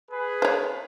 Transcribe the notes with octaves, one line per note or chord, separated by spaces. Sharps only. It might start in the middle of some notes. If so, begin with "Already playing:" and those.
G#4 B4
C5 C#5